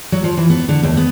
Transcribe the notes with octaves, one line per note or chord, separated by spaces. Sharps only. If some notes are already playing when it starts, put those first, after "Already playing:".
F#3
F3
E3
B3
D3
D#2
B3